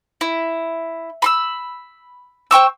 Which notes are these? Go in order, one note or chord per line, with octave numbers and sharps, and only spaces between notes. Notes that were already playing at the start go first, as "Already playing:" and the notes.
E4
B5 C6 E6
C5 G5 C#6 E6